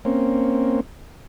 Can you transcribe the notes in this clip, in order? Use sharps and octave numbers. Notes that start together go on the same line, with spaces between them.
A#3 C4 C#4